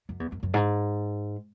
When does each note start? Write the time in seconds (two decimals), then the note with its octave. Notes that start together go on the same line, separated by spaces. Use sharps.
0.09 F#2
0.20 E2
0.32 F#2
0.43 F#2
0.54 G#2